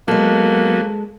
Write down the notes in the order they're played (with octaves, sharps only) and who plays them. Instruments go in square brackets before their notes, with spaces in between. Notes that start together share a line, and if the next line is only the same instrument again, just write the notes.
[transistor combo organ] F#3 B3 [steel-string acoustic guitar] G#3 A4 [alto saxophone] A#3